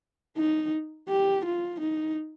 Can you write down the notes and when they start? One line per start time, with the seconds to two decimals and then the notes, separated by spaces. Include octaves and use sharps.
0.37 D#4
1.09 G4
1.45 F4
1.80 D#4